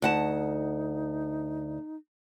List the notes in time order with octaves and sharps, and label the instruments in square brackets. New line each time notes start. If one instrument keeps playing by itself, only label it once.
[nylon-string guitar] D2 F#5 A5 [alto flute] D#4